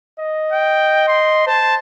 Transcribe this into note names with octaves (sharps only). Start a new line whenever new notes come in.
D#5
G5
C6
C5 A5